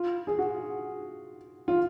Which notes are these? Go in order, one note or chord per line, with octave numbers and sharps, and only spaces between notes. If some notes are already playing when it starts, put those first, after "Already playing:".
Already playing: F4
G#4
F#4
F4